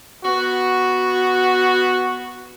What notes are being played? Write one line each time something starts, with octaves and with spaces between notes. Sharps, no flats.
B3 F#4